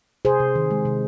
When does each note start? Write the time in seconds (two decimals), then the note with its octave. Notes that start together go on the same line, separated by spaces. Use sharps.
0.25 C3 G#4 C5
0.40 C3
0.55 D#3
0.71 G#3
0.85 C3